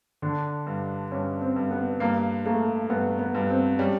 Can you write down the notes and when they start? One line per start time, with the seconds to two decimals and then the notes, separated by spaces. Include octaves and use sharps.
0.22 D3 D4
0.67 G2
1.12 G2 C#4
1.41 C4
1.56 G2
1.71 B3
2.00 G2 A#3
2.45 A3 A#3
2.90 G2 B3
3.19 B3
3.35 G2
3.50 C4
3.79 G3 C#4